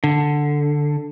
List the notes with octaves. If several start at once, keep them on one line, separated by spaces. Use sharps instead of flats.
D3